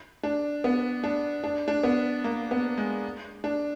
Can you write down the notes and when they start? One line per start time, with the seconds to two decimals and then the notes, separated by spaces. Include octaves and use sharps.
0.23 D4
0.64 B3
1.04 D4
1.44 D4
1.68 D4
1.83 B3
2.24 A#3
2.51 B3
2.78 G#3
3.44 D4